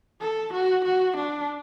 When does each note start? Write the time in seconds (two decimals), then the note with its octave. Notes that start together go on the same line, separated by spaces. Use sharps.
0.21 A4
0.53 F#4
0.85 F#4
1.17 D4